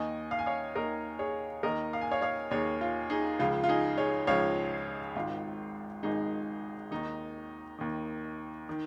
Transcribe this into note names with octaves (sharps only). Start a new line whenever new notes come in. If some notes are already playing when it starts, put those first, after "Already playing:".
Already playing: D#2 D#3 D#5 G#5
F5
G#5
C#5 F5
D#2 D#3 A#4 D#5
G#4 C#5
D#2 D#3 A#4 D#5
F5
G#5
C#5 F5
C#5 F5
D#2 D#3 G#4 C#5
F4
D#4 G#4
C#2 C#3 F3 F4
F4
D#4 G#4
G#4 C#5
C#2 C#3 F3 C#5 F5
G#1 G#2 D#3 F4
G#1 G#2 D#3 D#4 G#4
D#2 D#3 D#4
D#2 D#3
D#3